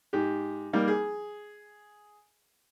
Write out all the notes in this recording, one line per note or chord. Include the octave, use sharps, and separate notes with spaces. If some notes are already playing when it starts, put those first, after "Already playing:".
G#2 G4
G3 A#3 D#4
G#4